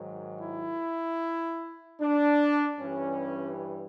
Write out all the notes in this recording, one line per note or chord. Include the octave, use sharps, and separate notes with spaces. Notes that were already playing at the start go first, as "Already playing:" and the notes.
Already playing: G#2 D#3 F#3
E4
D4
G2 E3 G3 C#4